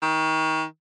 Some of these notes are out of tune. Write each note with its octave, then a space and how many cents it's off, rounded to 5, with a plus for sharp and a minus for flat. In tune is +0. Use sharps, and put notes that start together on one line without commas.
D#3 +30